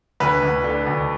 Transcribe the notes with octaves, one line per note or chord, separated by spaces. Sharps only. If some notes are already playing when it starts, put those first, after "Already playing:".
D2 B4
D2
D3
D2